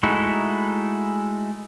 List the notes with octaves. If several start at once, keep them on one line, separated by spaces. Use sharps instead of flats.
G#3 A3 D#4 E4 F#4